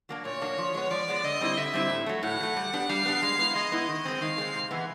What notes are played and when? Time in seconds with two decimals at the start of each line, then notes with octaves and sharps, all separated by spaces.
0.09 F#3 A#3 D4
0.25 A#2 C#5
0.41 F#3 A#3 D4
0.58 F3
0.74 G#3 B3
0.91 F3 D5
1.08 G#3 B3
1.24 D3 D#5
1.41 G3 C4 E4
1.57 D3 E5
1.74 G3 C4 E4
1.90 A2
2.06 F#3 A3
2.23 A2 F#5
2.40 F#3 A3
2.57 G3
2.73 B3 D4 G4
2.89 G3 F5
3.05 B3 D4 G4
3.22 G#3
3.39 B3 E4
3.55 G#3 D#5
3.72 B3 E4
3.89 D#3
4.05 G#3 C4
4.21 D#3 F5
4.38 G#3 C4
4.54 C3
4.71 E3 G#3 B3 E4